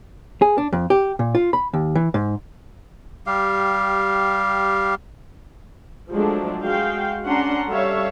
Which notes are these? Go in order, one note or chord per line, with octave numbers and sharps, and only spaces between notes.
G#4
D4
F2
G4
A#2
F4
B5
D#2
E3
G#2
G3 G4 F5
F3 F#3 G#3 A3 D4
G#3 F#4 F5 G5
C#4 D4 F#5 A#5 C6
G3 A4 C#5 E5 F5